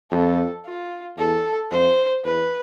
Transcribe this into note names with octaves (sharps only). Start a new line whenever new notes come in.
F2 A4
F4
E2 A4
F2 C5
E2 B4